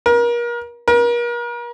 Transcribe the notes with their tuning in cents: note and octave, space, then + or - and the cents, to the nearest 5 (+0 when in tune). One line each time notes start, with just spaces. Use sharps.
A#4 +35
A#4 +40